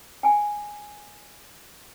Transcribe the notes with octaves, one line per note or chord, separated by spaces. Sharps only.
G5 G#5